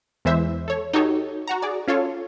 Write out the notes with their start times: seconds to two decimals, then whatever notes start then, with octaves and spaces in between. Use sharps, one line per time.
0.25 E2 E3 G#3 C5 E5
0.68 A4 C#5
0.93 D#4 F#4 G4 A4 C#5
1.47 F#4 F#5 A#5
1.62 G#4 D5
1.88 C#4 F4 A4 C#5